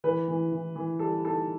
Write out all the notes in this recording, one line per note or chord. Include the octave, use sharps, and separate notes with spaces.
E3 B4
E3
E3
E3
G3 A4
D#4 A4